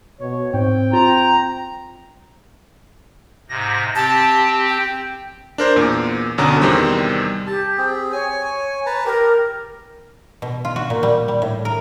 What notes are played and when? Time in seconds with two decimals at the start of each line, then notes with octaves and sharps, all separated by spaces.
0.21 B2 C#5
0.54 G#2 C4 G5
0.93 F4 A#5
3.50 G#2 C3 A#6
3.95 C4 G4 A5
4.69 G5
5.58 D4 A#4 C5
5.76 E2 A#2
6.38 G1 B2 D3 C#4 A#5
6.61 E2 C3 D#3 G3 C4
7.47 G4 A5
7.78 C4 G#4
8.13 C#5 G#5
8.86 B4 A5 A#5
9.06 G4 A#4
10.42 B2
10.65 F4
10.76 F#4
10.90 A#2
11.03 G3
11.28 G3
11.42 A2
11.65 A#4